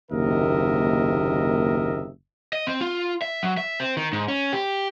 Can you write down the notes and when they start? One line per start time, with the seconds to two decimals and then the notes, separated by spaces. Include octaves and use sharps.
0.11 F#1 D#2 C3 A#4 D#5 E5
2.53 D#5
2.67 C4
2.81 F4
3.22 E5
3.43 F#3
3.57 E5
3.80 C4
3.97 D#3
4.13 G#2
4.28 C#4
4.53 G4